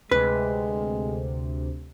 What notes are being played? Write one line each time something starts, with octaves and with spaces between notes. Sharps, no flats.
D2 C3 G#3 B4